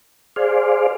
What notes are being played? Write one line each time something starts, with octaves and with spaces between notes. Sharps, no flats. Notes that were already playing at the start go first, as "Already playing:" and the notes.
G#4 C5 D5 F5